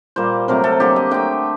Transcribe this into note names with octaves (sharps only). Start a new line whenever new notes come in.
A#2 G3 A#3 C5
C3 F#3 A3 A#4
A4
D3 F#3 A#3 G4
D#5
D3 A3 G5